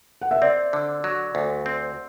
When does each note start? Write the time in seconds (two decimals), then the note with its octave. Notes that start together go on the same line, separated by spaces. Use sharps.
0.21 F#5
0.31 E5
0.42 C4 D5
0.73 D3
1.04 F#3
1.35 D2
1.66 C4